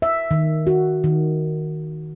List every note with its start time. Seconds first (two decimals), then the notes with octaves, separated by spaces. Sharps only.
0.02 E5
0.31 D#3
0.67 F#4
1.04 D#3